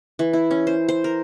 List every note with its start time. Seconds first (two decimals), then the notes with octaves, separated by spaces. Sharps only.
0.19 E3
0.33 E4
0.51 C#4
0.67 C5
0.88 C5
1.04 A#4